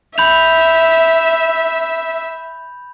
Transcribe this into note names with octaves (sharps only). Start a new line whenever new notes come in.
E5 B5 G6 F7